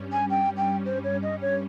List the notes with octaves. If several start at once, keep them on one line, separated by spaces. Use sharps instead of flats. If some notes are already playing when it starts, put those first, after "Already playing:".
Already playing: G2 G3 C#4
G#5
G5
G5
C5
C#5
D#5
C#5